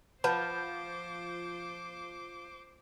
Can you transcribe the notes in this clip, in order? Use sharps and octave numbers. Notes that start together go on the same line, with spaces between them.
F3 F4 B4 C5 F#5 A5 B5 D6